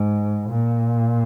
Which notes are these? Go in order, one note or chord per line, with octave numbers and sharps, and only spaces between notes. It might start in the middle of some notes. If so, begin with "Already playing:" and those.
Already playing: G#2
A#2